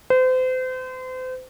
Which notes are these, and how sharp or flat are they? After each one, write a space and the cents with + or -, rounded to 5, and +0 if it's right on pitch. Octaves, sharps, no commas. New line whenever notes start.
C5 -35